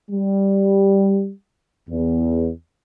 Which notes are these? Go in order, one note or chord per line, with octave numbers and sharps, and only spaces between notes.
G3
E2